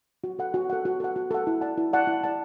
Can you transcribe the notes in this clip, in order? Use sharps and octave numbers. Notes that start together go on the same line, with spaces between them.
F#4
A4 F#5
F#4
A4 F#5
F#4
A4 F#5
F#4
A4 F#5
E4
D5 F#5 A5
E4
D5 F#5 A5
E4
D5 F#5 A5